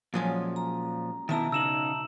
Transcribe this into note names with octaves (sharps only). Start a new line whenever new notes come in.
A#2 F3 F#3 G#3 C#4
A#5
B2 D#3 B3 E4 E5 A5 A#5
C#3 D#4 E6 E7 F#7